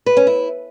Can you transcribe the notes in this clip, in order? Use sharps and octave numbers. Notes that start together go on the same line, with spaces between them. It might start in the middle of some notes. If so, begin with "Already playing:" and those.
B4
C#4
E4